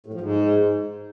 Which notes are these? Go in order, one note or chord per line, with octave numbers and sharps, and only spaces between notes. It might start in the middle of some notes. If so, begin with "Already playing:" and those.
A2
F3
G#2